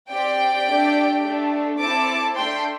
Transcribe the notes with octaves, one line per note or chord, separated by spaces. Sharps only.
C4 G4 D5 G5
A3 D4 G4
A3 D4 A4
C4 E4 A4 A5 D6
A3 D4 A4 G5 C6